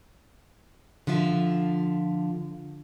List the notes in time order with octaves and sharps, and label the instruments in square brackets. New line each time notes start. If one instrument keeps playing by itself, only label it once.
[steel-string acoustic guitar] D3 F3 F4 E5